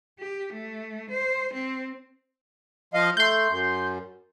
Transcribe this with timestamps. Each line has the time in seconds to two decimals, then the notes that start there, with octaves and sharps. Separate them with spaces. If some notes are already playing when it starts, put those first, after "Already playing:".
0.19 G4
0.53 A3
1.11 C5
1.54 C4
2.94 F3 D#5 F5
3.17 A3 C6 G6
3.49 F#2